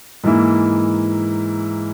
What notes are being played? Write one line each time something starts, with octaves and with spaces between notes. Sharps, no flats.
G#2 E3 A#3 E4